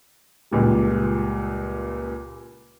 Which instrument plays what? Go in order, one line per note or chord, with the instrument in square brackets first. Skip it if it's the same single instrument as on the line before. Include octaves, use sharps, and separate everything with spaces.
[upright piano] C#2 A#2 G3